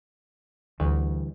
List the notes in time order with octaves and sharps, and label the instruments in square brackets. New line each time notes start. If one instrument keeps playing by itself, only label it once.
[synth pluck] D2 [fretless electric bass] D3 E3 G3